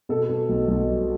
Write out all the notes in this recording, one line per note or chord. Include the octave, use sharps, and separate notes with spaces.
B2 A4
B2
B1
B1
G3